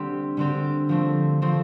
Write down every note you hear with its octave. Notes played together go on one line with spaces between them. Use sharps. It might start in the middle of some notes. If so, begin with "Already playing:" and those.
Already playing: D3 G3 C4 G4
D3 G3 C4 G4
F3 A3 C4
F3 A3 C4